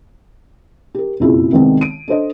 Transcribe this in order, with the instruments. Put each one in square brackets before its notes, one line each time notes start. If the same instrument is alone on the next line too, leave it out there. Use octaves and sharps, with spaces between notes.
[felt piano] G4 A#4
F#1 F2 B2 E4 F4 G#4
C2 D#3 G#3 B3 C4
D7 D#7
D4 A4 C5 D#5